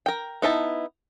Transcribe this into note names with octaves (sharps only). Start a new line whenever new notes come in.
A#4 G5
B3 D#4 E4 A5